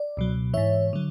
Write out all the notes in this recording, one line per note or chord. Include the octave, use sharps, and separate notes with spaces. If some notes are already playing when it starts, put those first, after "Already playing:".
Already playing: D5
C#2 B2 F#3
G#2 E3 C#5 E5
D3 F#3